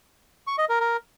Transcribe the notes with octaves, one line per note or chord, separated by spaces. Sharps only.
C#6
D#5
A#4
A#4